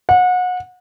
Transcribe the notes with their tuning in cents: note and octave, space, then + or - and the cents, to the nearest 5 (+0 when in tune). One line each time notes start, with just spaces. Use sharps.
F#5 -30